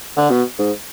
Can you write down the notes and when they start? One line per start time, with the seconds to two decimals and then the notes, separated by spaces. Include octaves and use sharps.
0.17 D3
0.30 B2
0.59 G#2